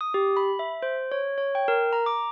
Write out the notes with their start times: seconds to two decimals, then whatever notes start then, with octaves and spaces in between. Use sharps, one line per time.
0.01 D#6
0.14 G4
0.37 B5
0.59 E5
0.82 C5
1.12 C#5
1.38 C#5
1.55 G5
1.68 A#4
1.93 A#5
2.06 D6